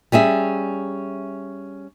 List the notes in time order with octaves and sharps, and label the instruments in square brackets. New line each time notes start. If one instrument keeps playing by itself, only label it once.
[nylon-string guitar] G3 C#4 G#4 E5